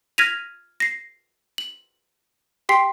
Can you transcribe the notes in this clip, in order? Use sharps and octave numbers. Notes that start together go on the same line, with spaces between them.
F6 G#6 A#6 B6 D#7 F7
A#6 C7
F#7
G4 G5 C6 B6 C7